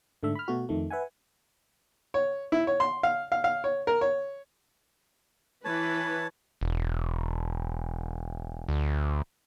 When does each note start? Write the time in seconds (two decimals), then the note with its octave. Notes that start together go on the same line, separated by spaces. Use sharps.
0.23 G#2 D3 A3 E5
0.35 B5 F6
0.48 B2 A3 F#4
0.69 F2 D#3 A3
0.90 B4 E5 F#5 G#5
2.14 C#5
2.52 E4
2.67 C#5
2.80 C6
3.03 F5
3.32 F5
3.44 F5
3.64 C#5
3.87 A#4
4.01 C#5
5.65 E3 B4 C#5 A5
6.61 E1
8.69 D2